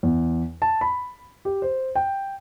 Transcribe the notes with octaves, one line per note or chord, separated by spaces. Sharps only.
E2
A5
B5
G4
C5
G5